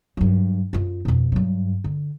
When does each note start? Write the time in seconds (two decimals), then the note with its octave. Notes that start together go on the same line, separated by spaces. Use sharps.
0.17 G2 F#3
0.73 F#2 F4
1.05 F2 B2
1.32 G2 F#3
1.84 D3